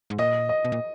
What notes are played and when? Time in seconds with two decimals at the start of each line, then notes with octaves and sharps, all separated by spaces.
0.10 G#2
0.18 A#2 D#5
0.49 D#5
0.65 B2
0.72 A#2